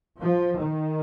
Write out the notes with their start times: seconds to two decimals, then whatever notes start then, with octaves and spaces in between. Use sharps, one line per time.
0.20 F3
0.59 D#3